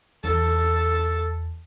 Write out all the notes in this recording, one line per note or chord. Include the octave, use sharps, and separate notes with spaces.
E2 A4